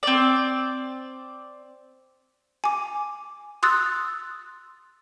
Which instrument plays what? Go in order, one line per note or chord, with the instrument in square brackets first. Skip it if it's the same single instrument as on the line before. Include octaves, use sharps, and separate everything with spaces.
[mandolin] C4 D5
[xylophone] G#5 D6
C6 D#6 E6 F#6 A6